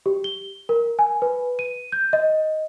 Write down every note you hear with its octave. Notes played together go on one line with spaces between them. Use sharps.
G4
G7
A#4
G#5
B4
D#7
G6
D#5